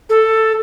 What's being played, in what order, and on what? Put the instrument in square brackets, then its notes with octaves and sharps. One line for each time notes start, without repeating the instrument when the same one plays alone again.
[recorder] A4